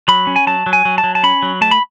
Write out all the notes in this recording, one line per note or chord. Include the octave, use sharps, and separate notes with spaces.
F#3 B5
C#4
G#5
F#3 A5
F#3
G#5
F#3
A5
F#3
A5
C#4 B5
F#3
A3 A5
B5